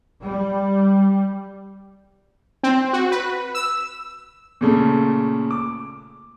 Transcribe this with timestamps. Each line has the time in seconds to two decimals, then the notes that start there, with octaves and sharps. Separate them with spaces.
0.21 G3
2.63 C4
2.93 F#4
3.12 B4
3.55 E6
4.61 A#2 C#3 A3
5.51 D6